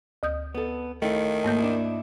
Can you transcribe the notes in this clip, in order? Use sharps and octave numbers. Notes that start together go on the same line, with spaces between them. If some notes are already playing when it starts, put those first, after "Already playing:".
D2 D#6 G6
B3 A4
D#3 A3 E4
G#2 A#3 G6
D4 E4